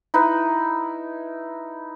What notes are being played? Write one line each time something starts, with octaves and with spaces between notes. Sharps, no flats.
D#4 E4 B4